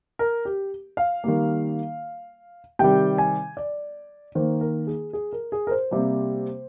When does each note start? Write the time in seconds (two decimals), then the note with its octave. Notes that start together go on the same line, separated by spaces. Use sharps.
0.19 A#4
0.45 G4
0.97 F5
1.24 D#3 G3 A#3
2.79 C3 D#3 G3 G5
3.18 G#5
3.57 D5
4.35 D#3 A#3 C5
4.61 A#4
4.87 G#4
5.13 G#4
5.33 A#4
5.52 G#4
5.67 A#4
5.71 C5
5.91 C3 G3 A#3